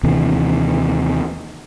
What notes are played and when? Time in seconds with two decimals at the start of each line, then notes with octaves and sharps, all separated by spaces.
0.03 D#2 C3 E3